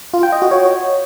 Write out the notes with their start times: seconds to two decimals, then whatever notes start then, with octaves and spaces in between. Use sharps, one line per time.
0.14 F4
0.23 G5
0.32 D#5
0.42 F#4
0.51 C#5